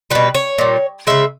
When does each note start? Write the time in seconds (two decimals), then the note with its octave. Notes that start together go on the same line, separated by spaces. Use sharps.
0.11 B2 G3 B4
0.35 C#5
0.58 A#2 G3
1.07 C#3 G#3 E5